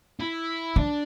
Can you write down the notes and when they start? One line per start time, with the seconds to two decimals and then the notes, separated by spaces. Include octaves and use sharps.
0.20 E4
0.76 F3 D4